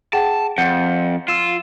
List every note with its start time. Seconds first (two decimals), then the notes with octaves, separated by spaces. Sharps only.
0.13 G#4 F#5 G5 A5
0.58 F2 F#5 G6 C#7
1.28 F4 E6 E7